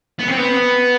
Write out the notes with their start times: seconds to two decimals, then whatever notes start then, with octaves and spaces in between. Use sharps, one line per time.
0.19 B3
0.28 C4
0.37 B3